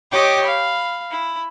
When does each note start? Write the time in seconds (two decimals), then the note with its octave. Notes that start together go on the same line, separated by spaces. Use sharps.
0.11 G4 C#5 D#5 G5 D6
0.45 F5 B5
1.11 E4